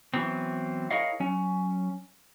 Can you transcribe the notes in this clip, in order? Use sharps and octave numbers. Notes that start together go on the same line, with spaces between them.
E3 F#3 B3 C4
E4 G#4 A#4 C#5 D#5 F5
F#3 C#4